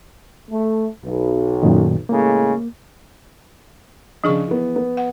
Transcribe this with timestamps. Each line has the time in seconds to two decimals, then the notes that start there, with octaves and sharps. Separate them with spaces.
0.49 A3
1.03 B1
1.63 F#2 A#2 D#3
2.09 A2 C#3 G#3 A#3
4.24 C#3 F3 D4 G#4 C#6
4.47 E3 B3
4.76 B3
4.97 F#5